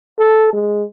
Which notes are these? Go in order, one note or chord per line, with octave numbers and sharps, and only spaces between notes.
A4
G#3